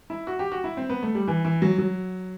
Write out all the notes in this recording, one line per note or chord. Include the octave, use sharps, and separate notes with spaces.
E4
F#4
G4
F#4
E4
C4
B3
A3
G3
E3
E3
F#3
F#3